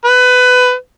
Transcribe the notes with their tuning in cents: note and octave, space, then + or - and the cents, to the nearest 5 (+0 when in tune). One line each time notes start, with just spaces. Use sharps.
B4 +20